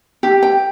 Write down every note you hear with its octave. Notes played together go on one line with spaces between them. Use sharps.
G4
G5